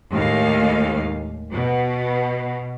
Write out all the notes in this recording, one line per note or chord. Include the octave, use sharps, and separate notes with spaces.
D#2 A2 G#3 F5
B2